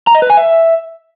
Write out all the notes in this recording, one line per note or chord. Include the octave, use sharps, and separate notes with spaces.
A#5
D#5
B4
G#5
E5